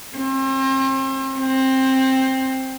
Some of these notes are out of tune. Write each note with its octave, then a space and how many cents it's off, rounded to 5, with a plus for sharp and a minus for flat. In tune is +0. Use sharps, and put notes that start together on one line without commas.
C4 +40
C4 +15